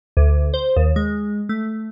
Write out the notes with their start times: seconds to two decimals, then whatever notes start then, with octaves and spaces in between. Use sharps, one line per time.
0.17 D2
0.54 C5
0.76 D#2
0.96 G#3
1.49 A3